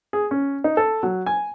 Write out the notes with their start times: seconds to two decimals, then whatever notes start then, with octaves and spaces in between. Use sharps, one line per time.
0.13 G#4
0.31 C#4
0.64 D#4
0.77 A4
1.03 F#3
1.26 G#5